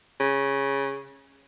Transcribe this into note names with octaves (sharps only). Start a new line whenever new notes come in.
C#3